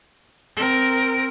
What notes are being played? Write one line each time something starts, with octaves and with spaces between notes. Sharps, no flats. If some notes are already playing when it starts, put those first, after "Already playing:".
C4 A#4